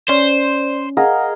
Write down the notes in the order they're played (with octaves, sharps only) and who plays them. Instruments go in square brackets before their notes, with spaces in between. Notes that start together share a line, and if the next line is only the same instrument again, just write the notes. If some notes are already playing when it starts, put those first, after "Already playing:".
[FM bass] C#4 [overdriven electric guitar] C5 [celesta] D5
[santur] G#4 A#4 D#5 [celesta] F5 F#5